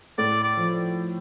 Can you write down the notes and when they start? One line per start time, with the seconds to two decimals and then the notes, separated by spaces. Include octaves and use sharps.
0.18 A2 D5
0.44 D5
0.57 F3